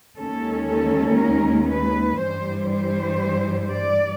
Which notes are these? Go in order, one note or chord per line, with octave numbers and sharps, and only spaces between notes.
D#2 D#3 G#3 C#4 A4
A4
A#4
B4
G2 E3 G3 C5
C5
D5